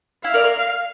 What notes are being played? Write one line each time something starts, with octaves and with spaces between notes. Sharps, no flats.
E4 F5
A#4 D5
A#4 D5